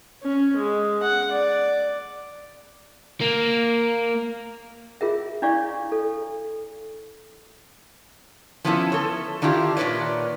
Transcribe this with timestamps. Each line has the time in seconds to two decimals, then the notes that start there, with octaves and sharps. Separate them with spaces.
0.22 C#4
0.57 G#3
1.02 F#5
1.31 D5
3.21 A#3
5.01 F4 G#4 A#4 E5
5.42 D4 E4 C#5 D5 F5 C#6
5.92 A4
8.65 F3 B3 C#4 E4 F4 A4
8.92 A4 C#5
9.42 D#3 D4 E4 F4 G4
9.77 A#2 D#3 B4 C#5 D5